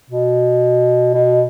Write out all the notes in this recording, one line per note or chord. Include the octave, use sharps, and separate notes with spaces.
B2
B2